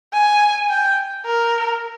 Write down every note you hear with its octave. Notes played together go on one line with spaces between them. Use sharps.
G#5
G5
A#4